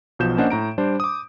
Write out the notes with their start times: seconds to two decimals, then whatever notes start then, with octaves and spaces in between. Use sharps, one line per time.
0.19 B1 B2 F3 G6 E7
0.38 A#3 C#4 D4 C5 D#5 F#5
0.50 A2 A#5 D7
0.78 G3 D4 C5
1.00 D6 D#6